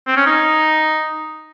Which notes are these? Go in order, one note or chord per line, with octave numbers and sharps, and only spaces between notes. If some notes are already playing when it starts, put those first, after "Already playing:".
C4
C#4
D#4